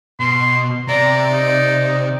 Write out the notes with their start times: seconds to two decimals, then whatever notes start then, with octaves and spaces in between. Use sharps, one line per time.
0.20 B2 C6
0.88 C3 D5 A#5
1.32 D#4